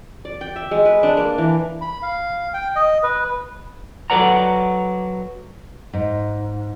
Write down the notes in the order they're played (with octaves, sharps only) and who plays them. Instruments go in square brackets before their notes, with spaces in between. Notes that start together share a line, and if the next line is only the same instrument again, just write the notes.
[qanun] D5
G5
E5
G#3
B4
D4
A#3
E3
[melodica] B5
F5
G5
D#5
B4
[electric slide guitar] F#3 A4 B4 D5 F#5 A#5
[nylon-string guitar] G#2